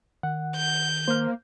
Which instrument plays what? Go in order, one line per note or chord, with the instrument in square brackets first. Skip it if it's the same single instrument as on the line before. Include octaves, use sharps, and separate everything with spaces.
[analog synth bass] D#3 [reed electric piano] F#5
[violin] G6
[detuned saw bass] A#3 [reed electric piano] C5 F6